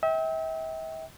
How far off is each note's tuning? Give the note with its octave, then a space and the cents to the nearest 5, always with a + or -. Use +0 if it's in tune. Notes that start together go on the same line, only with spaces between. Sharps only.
E5 -40 G5 +0